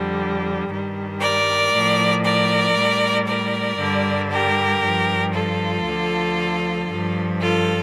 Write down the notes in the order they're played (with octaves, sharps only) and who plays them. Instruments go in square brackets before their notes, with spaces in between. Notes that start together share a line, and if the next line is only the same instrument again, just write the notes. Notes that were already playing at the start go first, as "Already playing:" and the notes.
Already playing: [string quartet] F2 D3 G3
G2 D#3 G3
A#4 D5
A2 F3
A#4 D5
A2 G3
A#4 D5
G2 D3 G3
G4 A#4
G2 F3
F4 A4
D2 D3 F3
G2 F3
F4 A4